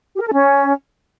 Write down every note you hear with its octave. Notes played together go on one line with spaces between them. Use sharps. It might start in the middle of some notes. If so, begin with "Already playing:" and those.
G4
A#4
A4
C#4